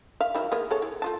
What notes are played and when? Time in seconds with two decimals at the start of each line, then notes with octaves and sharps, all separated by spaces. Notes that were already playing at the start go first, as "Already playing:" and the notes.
0.20 E5 F5
0.35 D#3 F#3 E4
0.52 A#3 B3 G#4
0.71 G#4 A4 C#5
0.82 E4
1.02 A3 F4 A5